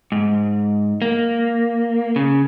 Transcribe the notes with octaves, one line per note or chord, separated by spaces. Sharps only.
G#2
A#3
C#3